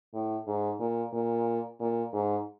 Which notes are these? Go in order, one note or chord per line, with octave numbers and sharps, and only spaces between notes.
A2
G#2
A#2
A#2
A#2
G#2